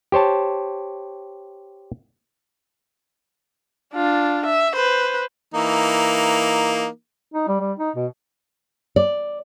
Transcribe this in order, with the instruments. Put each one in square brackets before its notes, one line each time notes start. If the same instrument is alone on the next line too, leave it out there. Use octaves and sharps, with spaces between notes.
[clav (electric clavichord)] G4 C5 C#5 A5
[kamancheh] D4 F4
E5
B4 C5
[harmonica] E3 A#3 D#4
[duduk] D#4
G3
G3
D#4
B2
[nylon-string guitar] D5